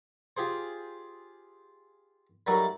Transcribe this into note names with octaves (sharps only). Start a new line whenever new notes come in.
F4 G4 G#4 C5
F#3 G3 A3 D#4 F#4 A#4